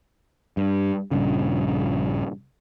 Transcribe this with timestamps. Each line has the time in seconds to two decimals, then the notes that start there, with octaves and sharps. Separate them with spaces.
0.57 G2
1.11 A#1 G2 C#3